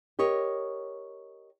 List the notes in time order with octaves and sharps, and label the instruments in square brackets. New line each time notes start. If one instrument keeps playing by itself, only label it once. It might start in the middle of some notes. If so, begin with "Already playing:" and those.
[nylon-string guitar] G4 A#4 C#5 D#5